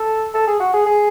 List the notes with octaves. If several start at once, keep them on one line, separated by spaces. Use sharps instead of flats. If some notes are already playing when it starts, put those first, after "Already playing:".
Already playing: A4
A4
G#4
F#4
G#4
G#4